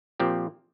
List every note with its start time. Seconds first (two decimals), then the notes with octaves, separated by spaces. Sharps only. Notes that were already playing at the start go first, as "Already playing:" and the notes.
0.20 A#2 F3 C4 G4